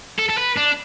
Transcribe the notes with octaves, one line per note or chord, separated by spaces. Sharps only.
A4
A4
B4
D4